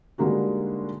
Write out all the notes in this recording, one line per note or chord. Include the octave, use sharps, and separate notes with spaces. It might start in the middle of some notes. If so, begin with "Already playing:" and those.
D3 G3 G#3 A#3 D#4 F#4